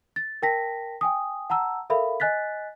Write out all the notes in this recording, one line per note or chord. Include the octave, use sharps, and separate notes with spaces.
A6
A#4 G5 A5 A#6 B6
G5 G#5 D#6
F#5 A5 A#5 E6
A4 A#4 E5 F5 B5
D#5 G#5 F#6 A6 B6